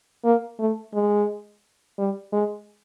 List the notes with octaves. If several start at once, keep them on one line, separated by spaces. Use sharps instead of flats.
A#3
A3
G#3
G3
G#3